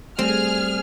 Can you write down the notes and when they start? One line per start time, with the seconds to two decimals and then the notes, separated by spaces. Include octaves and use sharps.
0.19 G3 A3 C4 G#4 F6